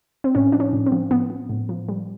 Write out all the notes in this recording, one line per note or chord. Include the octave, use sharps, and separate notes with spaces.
C4
A2 C#4
F3 D4
C#4
A2
C4
F3
A2 B3
F3
A2
F3
G3